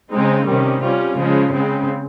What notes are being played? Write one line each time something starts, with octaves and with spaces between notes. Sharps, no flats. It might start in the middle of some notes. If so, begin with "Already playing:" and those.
C#3 G#3 C4 D#4
C3 D#3 G3 C#4
G3 C#4 F4
C#3 F3 G#3
C#3 G#3 C4